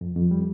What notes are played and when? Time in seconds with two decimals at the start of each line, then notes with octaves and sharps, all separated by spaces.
0.01 F2
0.16 F2
0.31 G3